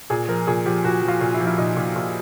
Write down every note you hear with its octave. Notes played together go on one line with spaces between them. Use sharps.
A#2 G#4
F3 A#4
A#2 G#4
F3 G4
A#2 F#4
F3
F4
A#2
E4
F3
E4
A#2 D#4
A#2
A#2